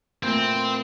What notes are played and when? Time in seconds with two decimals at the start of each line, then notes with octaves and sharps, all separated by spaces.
0.23 A#2 E3 A3 C4